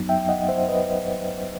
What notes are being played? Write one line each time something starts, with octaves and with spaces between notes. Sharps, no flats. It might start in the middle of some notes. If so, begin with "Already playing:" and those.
Already playing: F#2 F#3 B3 D#4
E5 G5
D#5 F#5
C5 E5
B4 D#5